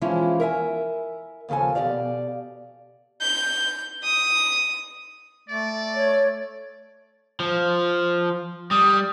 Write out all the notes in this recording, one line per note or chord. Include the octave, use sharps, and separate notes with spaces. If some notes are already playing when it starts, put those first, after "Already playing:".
E3 F3 G#3 C#4 E4 F4
A#4 E5 F5 G#5
D#2 C#3 F3 A4 G#5
B2 G4 D5 F5
G6
D#6
A3 D5
C#5
F3
G3 D#6